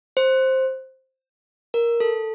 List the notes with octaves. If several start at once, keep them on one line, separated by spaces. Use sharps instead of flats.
C5
A#4
A4